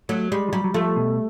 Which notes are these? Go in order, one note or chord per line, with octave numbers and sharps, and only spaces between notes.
F#3 A3
G3 G#3
F3
F#3 G3
F#3
F3 A3
B2